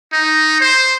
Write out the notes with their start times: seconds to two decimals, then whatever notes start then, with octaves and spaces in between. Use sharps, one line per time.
0.13 D#4
0.60 C5